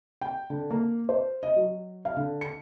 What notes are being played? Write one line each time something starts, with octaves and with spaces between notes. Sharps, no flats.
G5
D3
A#3
C5
D#5
F#3
F5
D3
C#7